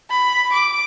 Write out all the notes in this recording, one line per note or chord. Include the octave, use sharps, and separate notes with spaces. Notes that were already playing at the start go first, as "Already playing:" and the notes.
B5
D6